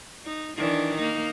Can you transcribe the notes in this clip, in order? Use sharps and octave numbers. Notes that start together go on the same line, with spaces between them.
D#4
D#3 E3 D4
A#3 D#4